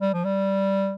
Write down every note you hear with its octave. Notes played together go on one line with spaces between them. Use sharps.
G3
F3
G3